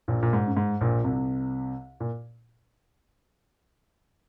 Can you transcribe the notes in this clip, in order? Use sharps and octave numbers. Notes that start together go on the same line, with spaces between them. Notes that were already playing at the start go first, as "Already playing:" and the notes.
A#1 A#2
A#2
G#2
F#2
G#2
A#1 A#2
C2 C3
A#2